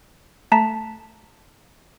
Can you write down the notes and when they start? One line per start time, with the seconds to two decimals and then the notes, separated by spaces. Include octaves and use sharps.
0.52 A3 A5 A#5 B6